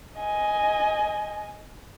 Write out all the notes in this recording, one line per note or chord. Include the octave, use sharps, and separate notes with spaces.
D#5 G#5